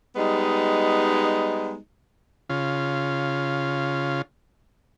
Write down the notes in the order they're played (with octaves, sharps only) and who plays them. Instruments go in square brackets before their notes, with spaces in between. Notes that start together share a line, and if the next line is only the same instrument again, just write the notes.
[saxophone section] G3 G#3 B3 D#4
[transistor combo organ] C#3 F4